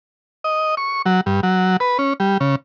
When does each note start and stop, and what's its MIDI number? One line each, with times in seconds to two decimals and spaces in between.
0.44 0.75 75
0.77 1.02 85
1.06 1.21 54
1.26 1.41 43
1.43 1.77 54
1.80 1.98 71
1.99 2.13 61
2.20 2.38 55
2.40 2.55 49